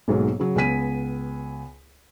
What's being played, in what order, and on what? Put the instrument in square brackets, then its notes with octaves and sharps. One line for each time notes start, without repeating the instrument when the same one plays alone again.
[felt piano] B1 G#2 F#3 A#3
C#3 F#3
C#2 B3 G#5 B6 D#7